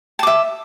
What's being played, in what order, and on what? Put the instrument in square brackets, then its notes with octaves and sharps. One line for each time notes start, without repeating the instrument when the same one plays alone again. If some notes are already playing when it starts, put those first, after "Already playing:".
[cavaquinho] A5
D6
E5